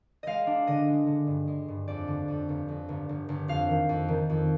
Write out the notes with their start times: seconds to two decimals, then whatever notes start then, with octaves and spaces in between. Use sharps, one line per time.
0.23 G#3 D#5 F5
0.47 D4
0.67 D3 D#5
0.88 G#3
1.07 D3
1.27 G2
1.48 G#3
1.68 G2
1.88 F2 D5
2.07 D3
2.28 F2
2.49 G1
2.68 F2
2.89 G1
3.09 G1
3.29 G1
3.48 F2 F5
3.69 D#3
3.89 F2
4.08 D#3
4.30 F2